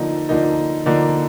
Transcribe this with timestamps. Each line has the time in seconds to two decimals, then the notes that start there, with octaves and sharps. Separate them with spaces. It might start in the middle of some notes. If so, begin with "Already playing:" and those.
Already playing: D3 F3 A#3 D#4
0.29 D3 F3 A#3 D#4
0.86 D3 F3 A#3 D#4